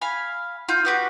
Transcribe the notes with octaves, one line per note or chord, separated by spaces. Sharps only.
F5 G#5 B5
F4 G6
B3 F#4 G4